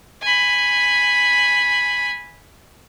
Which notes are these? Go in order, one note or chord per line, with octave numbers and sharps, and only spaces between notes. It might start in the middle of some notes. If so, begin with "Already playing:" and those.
G#5 B5